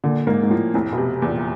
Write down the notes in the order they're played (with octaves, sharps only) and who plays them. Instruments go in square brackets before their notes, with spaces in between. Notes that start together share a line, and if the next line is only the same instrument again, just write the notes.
[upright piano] A#2 [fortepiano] D3
[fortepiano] G#2 [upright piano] A#3
[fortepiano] G#2
[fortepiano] A2 [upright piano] F3
[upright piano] F1 [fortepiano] A2
[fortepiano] B2
[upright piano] C3
E2
[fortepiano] A#2